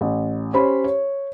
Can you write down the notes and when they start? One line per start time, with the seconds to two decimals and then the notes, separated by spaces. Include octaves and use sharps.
0.01 A1
0.53 C#4 G4 C5 C#5 B5
0.84 C#5